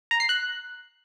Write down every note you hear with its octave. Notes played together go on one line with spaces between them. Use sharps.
A#5
C7
F#6